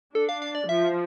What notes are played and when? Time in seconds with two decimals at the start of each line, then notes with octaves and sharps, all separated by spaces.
0.15 D4 A4
0.29 F5
0.42 F5
0.55 D5
0.68 F3 E5